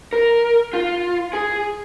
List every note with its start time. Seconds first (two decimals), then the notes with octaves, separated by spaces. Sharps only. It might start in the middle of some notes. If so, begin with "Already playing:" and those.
0.13 A#4
0.73 F4
1.33 G#4